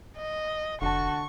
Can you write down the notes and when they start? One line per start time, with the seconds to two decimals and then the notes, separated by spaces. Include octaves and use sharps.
0.17 D#5
0.82 F1 D3 F#4 A5 C#6